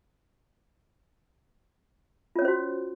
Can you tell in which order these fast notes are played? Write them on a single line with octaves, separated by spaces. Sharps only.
F4 C#5 C#4 C5 F#4